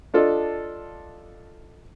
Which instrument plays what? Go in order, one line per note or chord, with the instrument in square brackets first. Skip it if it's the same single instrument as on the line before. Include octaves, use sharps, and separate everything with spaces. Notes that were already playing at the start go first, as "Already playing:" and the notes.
[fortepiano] D4 F4 A4 D#5